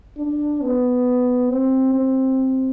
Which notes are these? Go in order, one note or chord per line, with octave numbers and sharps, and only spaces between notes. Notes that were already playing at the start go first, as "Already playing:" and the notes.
D4
B3
C4
C4